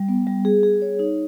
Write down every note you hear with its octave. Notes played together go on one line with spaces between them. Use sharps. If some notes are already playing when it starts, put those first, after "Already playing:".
Already playing: G3
B3
G3
G#4
G#4
C#5
D#4